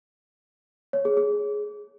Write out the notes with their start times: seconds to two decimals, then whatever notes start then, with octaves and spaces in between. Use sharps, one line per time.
0.93 C#5
1.05 G#4
1.17 G#4